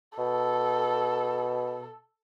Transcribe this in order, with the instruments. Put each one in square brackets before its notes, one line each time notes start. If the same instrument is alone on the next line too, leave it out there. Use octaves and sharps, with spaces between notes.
[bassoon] B2 [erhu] A4